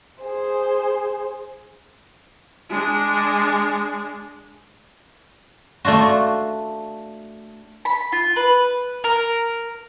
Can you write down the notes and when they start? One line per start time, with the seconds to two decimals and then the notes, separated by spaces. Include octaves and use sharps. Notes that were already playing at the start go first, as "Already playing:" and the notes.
0.22 G#4 C5
2.70 G#3 D4
5.85 A3 D4 F4 F#4
7.85 B5
8.12 F4
8.36 B4
9.04 A#4